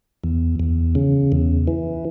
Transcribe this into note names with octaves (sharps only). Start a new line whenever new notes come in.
E2
E2
C#3
E2
E3